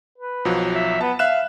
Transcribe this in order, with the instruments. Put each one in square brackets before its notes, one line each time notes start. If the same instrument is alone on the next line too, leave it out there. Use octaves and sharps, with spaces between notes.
[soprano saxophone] B4
[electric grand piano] B1 F3 F#3
[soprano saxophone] E5
[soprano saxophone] B3 [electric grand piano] A5
[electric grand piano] E5 F#6 E7 [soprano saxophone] F5